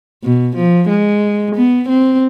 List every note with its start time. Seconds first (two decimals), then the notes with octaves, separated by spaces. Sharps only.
0.23 B2
0.57 F3
0.89 G#3
1.56 B3
1.89 C4